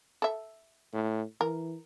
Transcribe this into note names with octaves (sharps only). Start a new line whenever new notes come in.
A4 E5
A2
E3 A#4